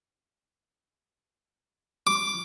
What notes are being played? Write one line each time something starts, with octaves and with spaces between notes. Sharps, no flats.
D6